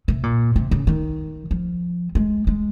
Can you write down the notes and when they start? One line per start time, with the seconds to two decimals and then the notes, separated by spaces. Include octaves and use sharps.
0.08 C3
0.23 A#2
0.56 C3
0.71 C#3
0.87 D#3
1.51 F3
2.15 G#3
2.47 G#3